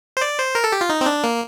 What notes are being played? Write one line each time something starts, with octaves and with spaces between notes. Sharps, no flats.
C5
D5
C5
A#4
A4
G4
F4
D#4
C4
D4
A#3